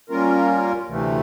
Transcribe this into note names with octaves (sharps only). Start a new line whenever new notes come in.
G3 A#3 C#4 F4 A#4
D2 C3 E3 A3